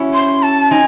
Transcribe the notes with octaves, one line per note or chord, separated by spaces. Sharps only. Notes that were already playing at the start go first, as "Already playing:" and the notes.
Already playing: C#4 E4 F#4
C6
A5
C4 D#4 G#5